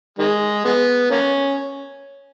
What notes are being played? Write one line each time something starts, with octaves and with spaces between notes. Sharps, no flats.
D#3 G#3
G#3 B3
A#3 C#4